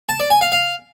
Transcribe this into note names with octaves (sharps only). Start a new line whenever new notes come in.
A5
D5
G#5
F5
F5